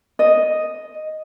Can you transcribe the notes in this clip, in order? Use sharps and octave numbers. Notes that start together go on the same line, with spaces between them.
D#5